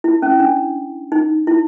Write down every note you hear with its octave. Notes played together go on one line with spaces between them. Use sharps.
E4
C#4
D4
D#4
E4